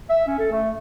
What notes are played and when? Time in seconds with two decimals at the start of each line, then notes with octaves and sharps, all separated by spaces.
0.10 E5
0.27 C#4
0.38 A4
0.51 A3